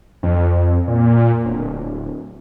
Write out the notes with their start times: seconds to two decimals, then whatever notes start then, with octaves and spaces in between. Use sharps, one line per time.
0.23 F2
0.88 A#2
1.45 D1